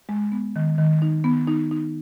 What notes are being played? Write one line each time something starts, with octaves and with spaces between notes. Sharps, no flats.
G#3
B3
D#3
D#3
D#4
B3
D#4
D#4